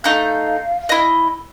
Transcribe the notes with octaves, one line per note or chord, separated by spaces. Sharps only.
A3 D#4 F5 G6
E4 D#5